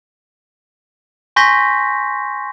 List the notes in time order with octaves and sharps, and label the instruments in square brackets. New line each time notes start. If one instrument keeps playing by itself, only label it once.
[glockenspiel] G#5 C6 C#6 G6 A#6 B6